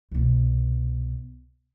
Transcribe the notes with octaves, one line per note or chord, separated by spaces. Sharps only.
C2 B2